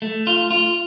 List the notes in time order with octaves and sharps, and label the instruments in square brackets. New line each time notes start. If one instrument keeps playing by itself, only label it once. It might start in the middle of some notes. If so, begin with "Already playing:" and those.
[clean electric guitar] A3
F4
F4